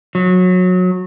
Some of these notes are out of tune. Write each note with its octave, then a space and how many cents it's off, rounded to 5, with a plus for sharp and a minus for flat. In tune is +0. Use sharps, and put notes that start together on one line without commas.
F#3 -20